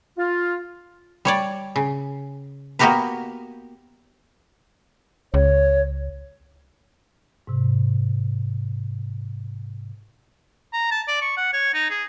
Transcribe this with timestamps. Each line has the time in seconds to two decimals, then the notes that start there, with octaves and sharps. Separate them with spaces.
0.18 F4
1.25 G3 C#5 D5
1.76 C#3
2.79 A#3 B3 F#4 G4 A#4 B4
5.34 C#2 C#5
7.47 G#2 C3
10.73 A#5
10.91 A5
11.08 D5
11.21 C#6
11.37 F#5
11.53 C#5
11.74 D#4
11.90 G#4